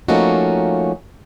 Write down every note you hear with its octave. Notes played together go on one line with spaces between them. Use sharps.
F3 A3 A#3 C#4 D#4 F#4